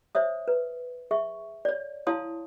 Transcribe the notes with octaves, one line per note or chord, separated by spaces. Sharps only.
C5 C#5 E5 D#6
B4
G#4 E5 C#6
C#5 D5
E4 C#5 F5 A5 C6 D#6